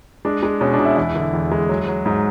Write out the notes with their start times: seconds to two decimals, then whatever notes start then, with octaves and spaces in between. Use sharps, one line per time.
0.25 G#3 D4
0.43 G#3
0.61 B2 C#4
0.73 D4
0.79 B2
0.85 E4
0.97 E2 E4
1.16 D3
1.34 E2
1.52 G#3
1.69 F#3
1.88 F#3
2.06 G#2